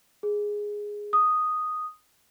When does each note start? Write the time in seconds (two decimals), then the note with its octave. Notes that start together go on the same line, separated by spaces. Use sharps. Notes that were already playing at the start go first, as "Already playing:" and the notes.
0.23 G#4
1.13 D#6